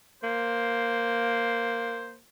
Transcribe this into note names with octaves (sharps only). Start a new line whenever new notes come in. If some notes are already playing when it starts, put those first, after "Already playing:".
A#3 C5